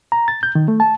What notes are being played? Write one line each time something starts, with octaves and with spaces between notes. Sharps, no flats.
A#5
A6
G6
D#3
A3
A5